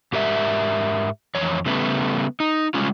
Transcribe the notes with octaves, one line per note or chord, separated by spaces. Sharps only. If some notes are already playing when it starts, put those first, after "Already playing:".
G#2 G4 A#4 E5
F2 E3 C#5
C#3 G3 A3 B3
D#4
G3 G#3 C#4 F4